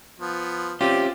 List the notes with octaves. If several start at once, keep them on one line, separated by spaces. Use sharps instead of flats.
F3 B3
C4 C#4 F4 G4 D5